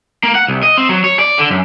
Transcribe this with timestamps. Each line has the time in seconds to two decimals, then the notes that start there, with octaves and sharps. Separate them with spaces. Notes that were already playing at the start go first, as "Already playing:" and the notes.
0.23 A#3
0.35 F#5
0.48 C2
0.63 D#5
0.78 C4
0.89 F#3
1.04 C#5
1.19 D5
1.39 D3
1.51 F#2